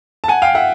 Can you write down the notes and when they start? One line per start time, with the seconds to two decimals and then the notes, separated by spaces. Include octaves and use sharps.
0.24 A5
0.28 F#5 G#5
0.42 F5 G5
0.55 E5 F#5